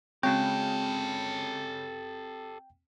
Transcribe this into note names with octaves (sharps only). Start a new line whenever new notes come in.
C#3 G#3 C4 F#4 G4 A4 C#5 G5